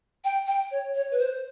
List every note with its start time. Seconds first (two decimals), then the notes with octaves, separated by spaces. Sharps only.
0.24 G5
0.47 G5
0.71 C#5
0.94 C#5
1.11 B4
1.19 C5